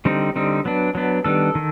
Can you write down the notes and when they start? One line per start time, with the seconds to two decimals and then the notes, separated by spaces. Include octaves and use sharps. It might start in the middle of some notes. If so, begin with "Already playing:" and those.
0.05 D3 G3 C4 D#4
0.36 D3 G3 C4 D#4
0.65 F#3 B3 D4
0.95 F#3 B3 D4
1.25 D#3 G3 B3 D4 A4
1.55 D#3